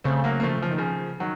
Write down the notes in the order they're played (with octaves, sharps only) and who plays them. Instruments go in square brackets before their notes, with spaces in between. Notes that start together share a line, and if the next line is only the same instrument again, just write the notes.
[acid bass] C#3 [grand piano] A3 C4
[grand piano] F#3 A#3
A#3
F3 A3
F3
D#3
C#3 F3
D#3 F#3